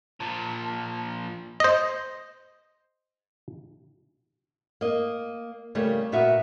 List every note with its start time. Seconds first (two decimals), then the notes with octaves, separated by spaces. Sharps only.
0.20 A#2 F3 A5
1.60 C5 D#5
4.81 A#3 D#5
5.75 C#3 G3 A3 A#3
6.12 A#2 B3 F#4 E5 F5